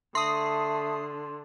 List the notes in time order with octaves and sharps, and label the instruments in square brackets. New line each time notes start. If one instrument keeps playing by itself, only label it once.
[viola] D3 [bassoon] A3 [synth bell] C6 [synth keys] D#6 C7